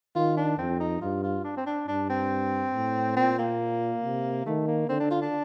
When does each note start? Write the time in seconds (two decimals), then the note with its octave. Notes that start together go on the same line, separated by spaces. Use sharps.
0.16 D#3 F4
0.37 D4
0.58 F2 C4
0.80 D#4
1.02 G2 F4
1.24 F4
1.44 D4
1.57 C4
1.67 D4
1.88 G2 D4
2.10 C4
2.74 A2
3.16 A#2 C4
3.39 A#3
4.03 C3
4.46 D#3 A3
4.67 A#3
4.89 D3 C4
5.00 D4
5.11 F4
5.22 D4